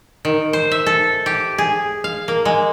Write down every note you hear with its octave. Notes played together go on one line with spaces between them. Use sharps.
D#3
C5
E5
A4
G4
G#4
F5
A#3
G#3